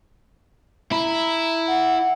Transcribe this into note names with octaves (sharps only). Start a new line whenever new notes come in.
E4 A#5 B5
F#5